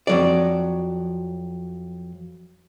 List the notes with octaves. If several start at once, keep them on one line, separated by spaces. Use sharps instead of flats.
F2 F#3 D5